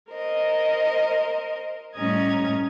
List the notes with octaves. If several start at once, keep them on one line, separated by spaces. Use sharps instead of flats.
A#4 C5 D#5
A2 G3 C#4 D#5 A#5 G#6